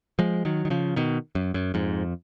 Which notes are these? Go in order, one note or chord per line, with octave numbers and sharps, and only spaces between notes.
F3 G#3
D#3 F#3
D#3
C#3 F3
B2 D#3
F#2
F#2
F2 G#2